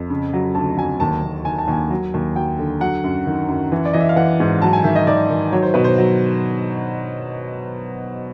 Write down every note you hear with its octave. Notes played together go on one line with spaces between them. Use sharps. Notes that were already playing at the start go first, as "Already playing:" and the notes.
Already playing: F2
C#3
F#3
D2 A5
F#3 G#5
D#2 A5
D#2
D#3 G#5
A5
D#2 G#5
F#3
D#2
F#3 G5
D3
F#3 F#5
F#2
D#3
F#2
E3
D5
E3 D#5
E5
F5
E3 F#5
G#2
F#3 A5
G#5
D#3 E5
D#5
D#3 D5
D#3
F#3 C#5
C5
B2 B4
C5
F#3